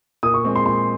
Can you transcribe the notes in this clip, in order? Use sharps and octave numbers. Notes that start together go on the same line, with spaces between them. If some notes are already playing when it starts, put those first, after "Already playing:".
A#2 D#6
C#6
G#3 C4
C6
A#2 C6